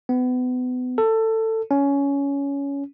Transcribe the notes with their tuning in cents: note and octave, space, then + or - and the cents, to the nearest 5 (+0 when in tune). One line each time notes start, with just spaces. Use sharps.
B3 +30
A4 +20
C#4 +15